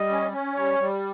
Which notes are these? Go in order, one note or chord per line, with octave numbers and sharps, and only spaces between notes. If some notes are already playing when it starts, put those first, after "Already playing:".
Already playing: G3 D#5
C#4
C#4
G3 C#5
G3